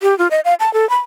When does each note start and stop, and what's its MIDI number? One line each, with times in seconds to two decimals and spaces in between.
0.02 0.17 67
0.18 0.28 65
0.31 0.40 75
0.45 0.54 77
0.60 0.72 81
0.74 0.88 69
0.89 0.98 83